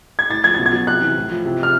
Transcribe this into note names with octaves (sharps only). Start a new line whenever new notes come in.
G#6
A2 A6
F3 G#6
B2 A6
G#6
F#3
C3 F#6
E3
A2
F3
C3
F3 F6